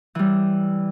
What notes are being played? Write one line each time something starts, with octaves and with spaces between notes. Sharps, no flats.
E3 G3